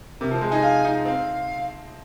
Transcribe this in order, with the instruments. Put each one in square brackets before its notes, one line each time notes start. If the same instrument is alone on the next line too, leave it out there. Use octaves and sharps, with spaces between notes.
[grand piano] C3 [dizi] A#4
[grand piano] F3
[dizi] C5
[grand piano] G#3
[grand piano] D#4 [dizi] G#5
[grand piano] F4
D#4
[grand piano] C4 [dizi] F5